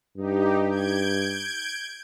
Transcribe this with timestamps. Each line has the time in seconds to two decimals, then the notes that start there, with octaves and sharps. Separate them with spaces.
0.18 G2 D#4 G4
0.70 G6 G#6 D7